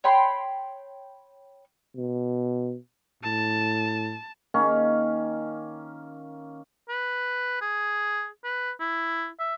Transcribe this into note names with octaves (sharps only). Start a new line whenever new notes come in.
C#5 G5 B5 C6
B2
A2 A5
D#3 A#3 C#4
B4
G#4
B4
E4
E5